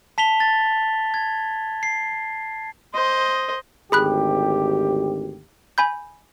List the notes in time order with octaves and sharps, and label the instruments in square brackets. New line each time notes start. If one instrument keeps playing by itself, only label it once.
[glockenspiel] A5 B6 F7 G7
A6
G#6
C7
[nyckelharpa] C5 D#5
[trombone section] G#1 D2 G4 [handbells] G#4 B5 F#6
[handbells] G#5 B5 G6